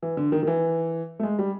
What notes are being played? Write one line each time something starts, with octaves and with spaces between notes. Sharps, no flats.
E3
D3
D#3
D#3
E3
A3
G#3
G3